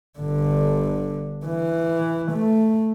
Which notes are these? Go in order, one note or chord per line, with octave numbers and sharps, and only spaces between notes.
G1 D3
E3
A3